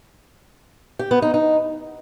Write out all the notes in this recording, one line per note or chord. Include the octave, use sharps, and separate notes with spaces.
G4
B3
D#4
D#4